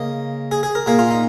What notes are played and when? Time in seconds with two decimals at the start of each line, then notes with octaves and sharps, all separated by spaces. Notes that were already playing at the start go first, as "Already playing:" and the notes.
Already playing: C#3 A#3 D#5
0.51 G#4
0.63 G#4
0.75 A#4
0.86 A#2 A#3 G#4
0.99 F4
1.11 D#4